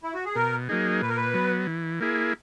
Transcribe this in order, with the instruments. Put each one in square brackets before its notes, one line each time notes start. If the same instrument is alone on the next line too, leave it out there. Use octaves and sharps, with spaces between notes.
[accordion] E4
F#4
G#4
[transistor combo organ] B2 [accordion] A#4
[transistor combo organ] F#3 A#3 D#4 G#4
[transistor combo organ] A#2 [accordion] B4
[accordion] A#4
B4
[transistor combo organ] F#3 B3
E3
A#3 E4 G#4